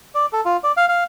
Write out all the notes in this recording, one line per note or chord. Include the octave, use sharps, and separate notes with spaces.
D5
A4
F4
D5
F5
F5